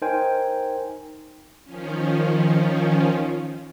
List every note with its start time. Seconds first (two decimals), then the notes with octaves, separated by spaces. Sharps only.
0.02 D#4 A#4 C5 G5 G#5
1.64 D#3 F3 C#4